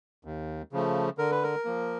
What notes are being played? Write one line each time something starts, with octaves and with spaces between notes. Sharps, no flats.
D#2
C#3 F3 A3
D3 A#4
B4
A#4
F3 A#3